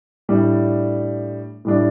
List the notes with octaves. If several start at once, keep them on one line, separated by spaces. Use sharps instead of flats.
A2 G3 D4
A2 G3 D4